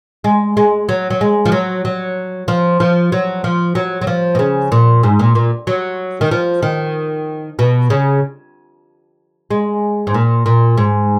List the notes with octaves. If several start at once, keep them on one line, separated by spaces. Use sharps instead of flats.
G#3
G#3
F#3
F#3
G#3
F3
F#3
F#3
F3
F3
F#3
F3
F#3
F#3
F3
B2
C#3
A#2
G#2
A#2
A#2
F#3
D#3
F3
D#3
B2
C#3
G#3
G#2
A#2
A#2
G#2